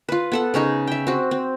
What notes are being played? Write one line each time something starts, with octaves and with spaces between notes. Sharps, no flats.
F4 B4
B3 A4 F#5
C#3 C#4 D#4 G#4
E5 G5
C4 F#4
C4